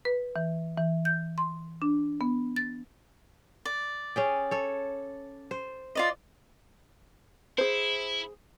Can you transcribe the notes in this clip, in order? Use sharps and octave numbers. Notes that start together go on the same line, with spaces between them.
B4
E3
E3
G6
C6
D4
B3
A6
D5
C#4 G#4 G5
A4 C#5
C5
F4 D5 D#5
E4 G#4 C5